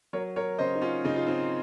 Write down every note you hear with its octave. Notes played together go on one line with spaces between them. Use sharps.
F#3 A#4 C#5
A#4 C#5
C#3 C5 D#5
D#4
C#4 F4
C#3 D#4
F4
C4 D#4